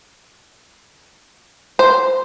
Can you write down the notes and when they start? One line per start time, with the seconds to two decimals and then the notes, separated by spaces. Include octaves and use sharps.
1.79 C5